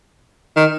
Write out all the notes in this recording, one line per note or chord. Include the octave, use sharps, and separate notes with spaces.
D#3